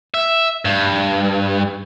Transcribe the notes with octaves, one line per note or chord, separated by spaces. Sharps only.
E5
G2